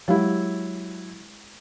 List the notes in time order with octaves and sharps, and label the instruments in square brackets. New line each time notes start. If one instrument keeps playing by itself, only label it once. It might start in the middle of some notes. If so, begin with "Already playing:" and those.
[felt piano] F#3 E4 [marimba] G#3 G4 F5